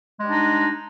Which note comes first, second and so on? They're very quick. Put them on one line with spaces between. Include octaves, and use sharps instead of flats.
G#3 G3 D4 D#4